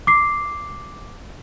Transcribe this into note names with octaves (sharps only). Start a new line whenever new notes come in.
D6 C7